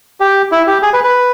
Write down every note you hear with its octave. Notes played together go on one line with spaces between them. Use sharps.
G4
E4
G4
G#4
B4
B4